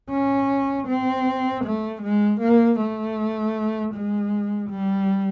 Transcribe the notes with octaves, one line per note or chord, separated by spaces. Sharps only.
C#4
C4
A3
G#3
A#3
A3
G#3
G3